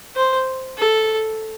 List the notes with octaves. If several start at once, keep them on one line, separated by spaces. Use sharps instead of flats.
C5
A4